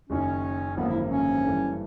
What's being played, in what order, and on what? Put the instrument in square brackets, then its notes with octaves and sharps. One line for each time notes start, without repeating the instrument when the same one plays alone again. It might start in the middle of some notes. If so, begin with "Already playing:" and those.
[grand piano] F#1 F#2 D#3 [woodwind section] C#4
[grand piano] G#1 F#2 D3 F3 A#3 [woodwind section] B3
[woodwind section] E4
C#4
[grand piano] G2 E3 A3 D4